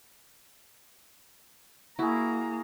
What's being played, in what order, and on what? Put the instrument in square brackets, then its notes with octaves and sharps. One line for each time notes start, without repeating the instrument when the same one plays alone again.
[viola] A#3 A#5 [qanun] E4 [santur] F#4 G#4